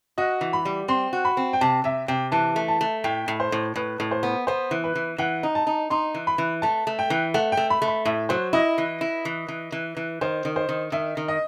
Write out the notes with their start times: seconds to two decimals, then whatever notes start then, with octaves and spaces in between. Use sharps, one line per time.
0.18 F#4 D#5
0.41 E3
0.53 B5
0.65 G3
0.88 C4 C6
1.13 F#4
1.25 B5
1.37 C4
1.53 G5
1.61 C3 A5
1.84 C3 E5
2.08 C3 G5
2.32 E3 A5
2.56 A3
2.68 A5
2.81 A3
3.04 A2 G5
3.28 A2
3.40 C5
3.52 A2
3.76 A2 B4
4.00 A2
4.11 C5
4.23 B3
4.47 B3 C5
4.71 E3
4.84 B4
4.96 E3
5.18 E3 F#5
5.43 D#4
5.55 A5
5.67 D#4
5.90 D#4 C6
6.15 E3
6.27 B5
6.38 E3
6.62 A3 A5
6.87 A3
6.99 G5
7.10 E3
7.34 A3 F#5
7.52 G5
7.57 A3
7.70 B5
7.82 A3
7.88 B5
8.05 A2 E5
8.29 F#3 C5
8.53 E4 D#5
8.78 E3
9.01 E4
9.25 E3
9.48 E3
9.72 E3
9.97 E3
10.21 D#3 C5
10.45 D#3
10.56 C5
10.69 D#3
10.92 D#3 E5
11.17 D#3
11.28 D#5